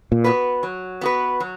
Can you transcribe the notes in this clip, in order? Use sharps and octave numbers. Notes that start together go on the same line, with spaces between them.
A#2
B3 F#4 B4
F#3
B3 F#4 B4
F#3